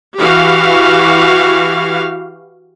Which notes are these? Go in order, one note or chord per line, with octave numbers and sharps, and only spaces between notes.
E3 F#4 G4 F5